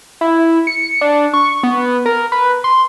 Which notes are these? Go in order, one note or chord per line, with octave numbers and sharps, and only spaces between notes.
E4
C#7
D4
C#6
B3
A#4
B4
C6